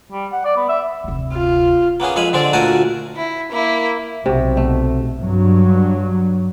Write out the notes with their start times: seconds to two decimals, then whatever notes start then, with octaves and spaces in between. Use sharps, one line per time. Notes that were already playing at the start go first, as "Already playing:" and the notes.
0.11 G3
0.32 F#5
0.44 D5
0.56 B3
0.68 E5
1.04 F1 D2
1.33 F4
2.00 A#3 B3 C#4 G#4
2.16 F2 G#3 F5 G#5 B5
2.33 D3 G#3 C4 C5 D5
2.53 D2 A#2 F#4 A#4 G#5 A5
3.16 E4
3.52 A#3 E4
4.26 B1 C3 F#4
4.57 A3
5.17 G2 F#3